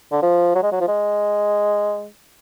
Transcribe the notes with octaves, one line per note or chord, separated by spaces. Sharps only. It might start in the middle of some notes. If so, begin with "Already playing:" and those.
D3
F3
F#3
G#3
F#3
F3
G#3